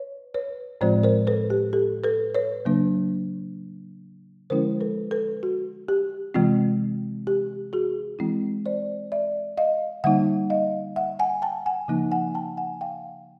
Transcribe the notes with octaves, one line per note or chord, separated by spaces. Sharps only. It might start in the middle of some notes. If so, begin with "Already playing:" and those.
Already playing: B4 C#5
B4 C#5
A2 F3 G#3 C4 F4 C5 D5
A#4 C5
A4 B4
G4
G4 A4
A4 B4
B4 C#5
C#3 F#3 A#3 D4
D3 F3 G#3 C#4 E4 A#4 C5
A4 B4
A4 B4
F#4
G4
C3 E3 G#3 C4 F4
G4
F#4 G#4
E3 G#3 C4 E4
C5 D5
D5 E5
D#5 F5
D3 G3 A#3 D#4 E5 F#5
D#5 F5
E5 F#5
F#5 G#5
G5 A5
F#5 G#5
C#3 F3 A#3 D#4
F#5 G#5
G5 A5
F#5 G#5
F5 G5